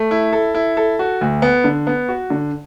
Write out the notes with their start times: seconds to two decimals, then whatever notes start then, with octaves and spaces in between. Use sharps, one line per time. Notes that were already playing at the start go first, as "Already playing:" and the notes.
Already playing: A3
0.11 E4
0.33 A4
0.55 E4
0.77 A4
0.99 F#4
1.21 D2
1.42 B3
1.64 D3
1.87 B3
2.09 F#4
2.30 D3